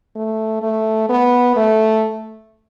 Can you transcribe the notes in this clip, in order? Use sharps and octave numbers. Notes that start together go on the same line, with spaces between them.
A3
A3
B3
A3